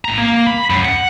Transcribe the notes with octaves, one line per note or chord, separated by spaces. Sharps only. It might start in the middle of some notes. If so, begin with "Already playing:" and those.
A2 A#5
A#3
B5
F#2
F#5